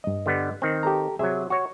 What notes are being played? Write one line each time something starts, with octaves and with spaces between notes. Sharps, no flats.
G2 D#5
D3 G3 B3
D#3 C4
G4 A4 A#5
C3 F#3 G#4 E5
F#4 C#5 C#6